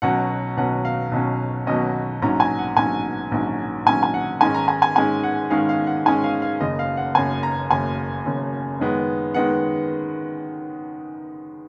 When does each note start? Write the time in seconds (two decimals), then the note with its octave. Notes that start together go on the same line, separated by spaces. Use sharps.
0.02 B1 B2 F#3 C#4 F#5
0.57 B1 B2 F#3 C#4 F#5
0.85 F5
1.12 B1 B2 F#3 C#4
1.66 B1 B2 F#3 C#4 D#5
2.22 A#1 G#2 F#3 C#4 A#5
2.40 G#5
2.59 F#5
2.77 A#1 G#2 F#3 C#4 G#5
3.32 A#1 G#2 F#3 C#4
3.86 A#1 G#2 F#3 C#4 G#5
4.03 G#5
4.14 F#5
4.41 G#2 D#3 G#3 C#4 G#5
4.54 A#5
4.68 G#5
4.82 G#5
4.96 G#2 D#3 G#3 C#4 G#5
5.23 F#5
5.50 G#2 D#3 G#3 C#4 F5
5.69 F5
5.87 F#5
6.06 G#2 D#3 G#3 C#4 G#5
6.24 F5
6.42 F5
6.61 F#1 F#2 C#3 D#5
6.79 F5
6.97 F#5
7.15 F#1 F#2 C#3 G#5
7.43 A#5
7.71 F#1 F#2 C#3 G#5
8.25 F#1 F#2 C#3
8.80 F#2 D#3 G#3 B3
9.34 D#3 G#3 B3 F#5